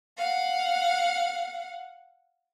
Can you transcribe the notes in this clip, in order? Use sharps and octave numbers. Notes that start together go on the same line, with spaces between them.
F5 F#5